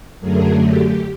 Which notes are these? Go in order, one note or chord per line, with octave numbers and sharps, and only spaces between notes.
F#2 D3 F#3 A3 G#4 A#4
G4